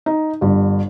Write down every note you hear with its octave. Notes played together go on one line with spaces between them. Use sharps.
D#4
G1 G2